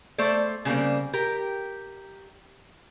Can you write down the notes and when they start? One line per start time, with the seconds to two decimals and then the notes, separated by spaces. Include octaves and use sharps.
0.18 A3 A4 C5 D5
0.65 C#3 G3 A#3 C4
1.13 G4 A#4